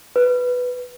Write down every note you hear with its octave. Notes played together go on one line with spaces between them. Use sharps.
B4